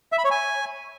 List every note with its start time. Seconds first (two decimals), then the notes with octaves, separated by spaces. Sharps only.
0.12 E5
0.18 B5
0.25 C#5
0.31 G#5